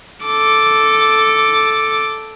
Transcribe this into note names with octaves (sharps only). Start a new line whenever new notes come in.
A4 D6